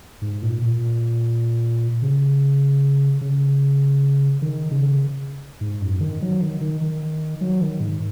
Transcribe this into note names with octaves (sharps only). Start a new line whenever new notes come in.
G#2
A#2
A#2
C#3
C#3
D#3
C#3
G#2
F#2
D#3
F#3
D#3
D#3
D#3
F#3
D#3
G#2